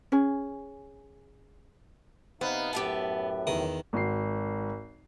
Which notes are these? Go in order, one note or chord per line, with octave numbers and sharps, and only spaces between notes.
C#4 G#4
C3 B3 C4 D#4 F5
F#2 A2 G4 E5 A5
E2 D#3 D#6
G#1 F#4 C7